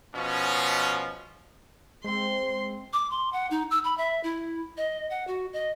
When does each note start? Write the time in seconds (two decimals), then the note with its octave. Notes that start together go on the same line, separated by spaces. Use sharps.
0.15 B2 F3 C#4
2.04 G#3 C4 C5 C6
2.93 D6
3.11 C6
3.33 F#5
3.51 D#4
3.71 E6
3.84 B5
3.98 E5
4.24 E4
4.77 D#5
5.10 F#5
5.27 F#4
5.53 D#5